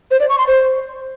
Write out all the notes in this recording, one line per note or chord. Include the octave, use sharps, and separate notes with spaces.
C5
D5
C#6
C6
C5